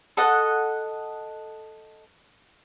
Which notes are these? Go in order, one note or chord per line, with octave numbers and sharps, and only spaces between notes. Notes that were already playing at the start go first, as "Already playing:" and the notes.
A4 D#5 F#5